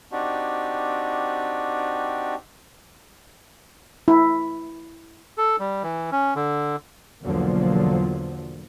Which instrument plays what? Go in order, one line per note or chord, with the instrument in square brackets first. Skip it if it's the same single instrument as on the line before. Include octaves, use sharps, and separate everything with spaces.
[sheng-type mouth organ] C4 D4 D#4 F#4 G4
[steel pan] E4
[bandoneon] A4
G3
E3
C#4
D3
[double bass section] B1 E2 D3 F3 F#3 A#3